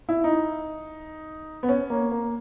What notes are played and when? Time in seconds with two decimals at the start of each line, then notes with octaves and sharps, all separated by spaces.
0.09 E4
0.24 D#4
1.63 B3
1.69 C#4
1.90 A#3
2.11 A#3